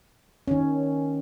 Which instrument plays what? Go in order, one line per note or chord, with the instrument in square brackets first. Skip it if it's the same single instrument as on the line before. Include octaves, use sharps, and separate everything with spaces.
[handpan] D#3 C#4